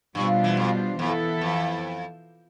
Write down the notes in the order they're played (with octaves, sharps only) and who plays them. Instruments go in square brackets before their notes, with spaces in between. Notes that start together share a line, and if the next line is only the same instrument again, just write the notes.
[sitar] G2 [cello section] B2 G3 D4 F4 C5
[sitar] E3
F2
[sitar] F2 [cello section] E3 B3 E4 A4
[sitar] F2